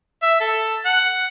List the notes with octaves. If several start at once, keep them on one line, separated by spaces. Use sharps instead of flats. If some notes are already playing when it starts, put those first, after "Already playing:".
E5
A4
F#5